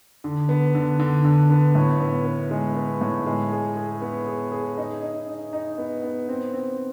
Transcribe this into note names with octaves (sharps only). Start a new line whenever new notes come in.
D3
B3
D3
D3
D3
B3
A2
B3
B3
G#3
B3
A2
G#3
G#4
G#4
B3
G#4
G#4
D#4
D#4
D#4
D#4
B3
B3
C4
C4